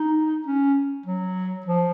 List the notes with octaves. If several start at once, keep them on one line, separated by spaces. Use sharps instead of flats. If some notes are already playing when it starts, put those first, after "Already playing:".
Already playing: D#4
C#4
F#3
F3